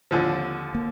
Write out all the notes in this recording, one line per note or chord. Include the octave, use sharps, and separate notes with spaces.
D#2 D3 F3
A#3